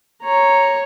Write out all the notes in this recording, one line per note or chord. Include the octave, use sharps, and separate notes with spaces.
C#5 A#5